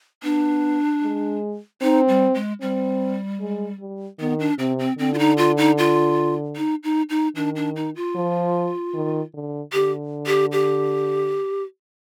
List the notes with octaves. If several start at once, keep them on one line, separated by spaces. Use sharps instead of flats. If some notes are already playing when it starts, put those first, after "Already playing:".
B3 D4
G#3
C4 D#4
G3
G#3
G3 C4
G#3
G3
D#3 B3
D4
C3 C4
C4
D3 C4
F4
D#4
F4
D#4
F4
D#4
D#4
D#4
D#3 D4
D4
D#4
F4
F3
D#3
D3
D3 G4
G4
G4